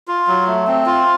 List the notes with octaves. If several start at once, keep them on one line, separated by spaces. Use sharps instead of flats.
F4
F#3
A3
C4
F4